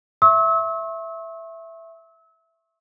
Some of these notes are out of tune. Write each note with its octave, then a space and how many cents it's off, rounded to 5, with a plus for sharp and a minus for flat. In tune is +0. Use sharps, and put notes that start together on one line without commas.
E5 +5 C#6 -35 E6 -35